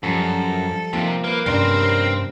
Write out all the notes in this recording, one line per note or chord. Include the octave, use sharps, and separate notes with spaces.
F#2 F3 G3 A4
C3 F3 A#3 D#4
A#3 B4
G2 C3 G3 C4 C#4 A#4 C5